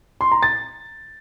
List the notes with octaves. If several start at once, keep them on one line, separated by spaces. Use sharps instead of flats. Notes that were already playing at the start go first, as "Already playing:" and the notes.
C6
A#5
A6